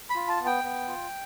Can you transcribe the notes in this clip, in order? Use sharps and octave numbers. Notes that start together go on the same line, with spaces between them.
B5
F4
A5
B3
G5
B3
F4